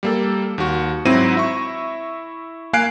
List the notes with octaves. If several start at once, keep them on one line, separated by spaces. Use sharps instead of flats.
G3 A#3 A4
D#2 F#4
G#2 F#3 C4 E4 A#6 D#7
E4 E5 C#6
A#3 F5 G#5 F#6 C7 D7